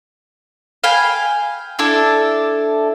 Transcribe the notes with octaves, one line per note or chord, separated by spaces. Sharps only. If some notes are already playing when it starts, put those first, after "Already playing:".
F5 G5 G#5 B5
D4 E4 A4